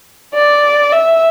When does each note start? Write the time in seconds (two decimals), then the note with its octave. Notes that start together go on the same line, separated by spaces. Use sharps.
0.34 D5
0.92 E5